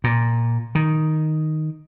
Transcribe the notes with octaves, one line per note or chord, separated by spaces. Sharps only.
A#2
D#3